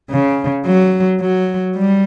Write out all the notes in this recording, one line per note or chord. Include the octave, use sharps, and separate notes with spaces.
C#3
F#3
F#3
G3